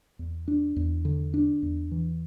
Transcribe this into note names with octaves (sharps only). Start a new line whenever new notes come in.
E2
D4
E2
D3
D4
E2
E3